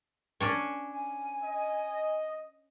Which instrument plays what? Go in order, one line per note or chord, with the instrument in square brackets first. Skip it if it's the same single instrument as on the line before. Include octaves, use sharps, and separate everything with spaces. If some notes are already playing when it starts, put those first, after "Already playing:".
[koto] C#4 D4 C#5
[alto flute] G#5
[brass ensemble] D#5